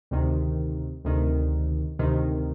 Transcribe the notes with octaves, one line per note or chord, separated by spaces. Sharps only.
D2 C3 D#3
D2 C3 D#3
D2 C3 D#3